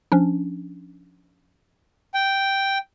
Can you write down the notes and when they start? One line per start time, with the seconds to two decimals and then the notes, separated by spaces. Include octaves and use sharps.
0.12 F3 C#4 D4
2.14 G5